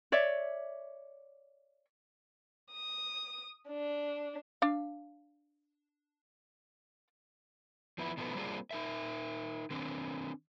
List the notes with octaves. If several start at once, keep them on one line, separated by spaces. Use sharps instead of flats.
C#5 D5 E5
D#6
D4
D4 F5
F3 B3 E4
B2 D#3 F3 A3 B3
G3 A#3 C4 D4 F4 G#4
D#4 A#4 E5
D#3 C4 D4